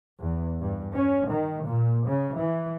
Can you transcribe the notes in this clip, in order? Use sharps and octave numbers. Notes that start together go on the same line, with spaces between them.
E2
G2
C#4
D#3
A#2
C#3
E3